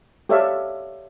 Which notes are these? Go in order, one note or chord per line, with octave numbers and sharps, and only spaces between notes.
G4 A4 C#5 D5 E5 F5